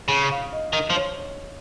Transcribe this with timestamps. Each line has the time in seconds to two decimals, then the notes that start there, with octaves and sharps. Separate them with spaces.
0.08 C#3
0.31 F5
0.52 D#5
0.73 D#3 D#5
0.90 F3
0.95 C#5